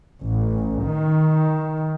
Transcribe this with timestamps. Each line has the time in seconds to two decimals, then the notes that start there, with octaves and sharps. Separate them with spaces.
0.21 A1
0.83 D#3